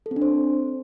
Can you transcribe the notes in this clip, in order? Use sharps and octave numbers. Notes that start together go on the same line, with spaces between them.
A4
C4
D4
C5